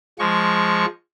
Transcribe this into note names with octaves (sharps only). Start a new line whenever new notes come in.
F3 G#3 C#6